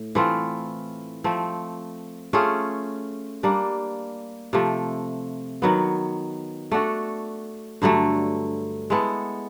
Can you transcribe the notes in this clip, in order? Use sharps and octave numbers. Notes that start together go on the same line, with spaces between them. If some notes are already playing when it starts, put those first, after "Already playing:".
Already playing: A2
E3 A3 C4 F4
F3 A3 C4
A3 C#4 F4 G#4
G3 A#3 D4
C3 F3 A3
D#3 F#3 B3
A3 D4 F#4 A4
G2 D3 F#3 A3
G#3 B3 E4 A4